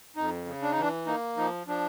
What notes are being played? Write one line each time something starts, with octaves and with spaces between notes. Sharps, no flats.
F2 D#4
C#3
D4
D#4
E3 D4
A#3 D#4
F3 D#4
F3 D4